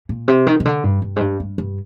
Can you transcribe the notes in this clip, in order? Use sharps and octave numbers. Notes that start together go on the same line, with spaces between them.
A#2
C3
D#3
C3
D3
G2
G2
G#2
G2
G2
G2